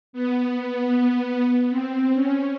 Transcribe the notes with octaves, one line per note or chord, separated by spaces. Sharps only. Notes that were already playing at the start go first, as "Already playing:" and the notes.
B3
C4
C#4